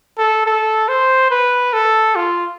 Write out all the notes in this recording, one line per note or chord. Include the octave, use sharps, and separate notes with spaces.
A4
A4
C5
B4
A4
F4